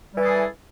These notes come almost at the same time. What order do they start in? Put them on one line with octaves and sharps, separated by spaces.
G3 E3 A4 G#4